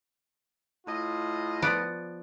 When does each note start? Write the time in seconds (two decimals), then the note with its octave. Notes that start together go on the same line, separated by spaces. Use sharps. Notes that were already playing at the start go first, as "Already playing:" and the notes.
0.86 A2 F4 D#5
1.62 F3 B3 D5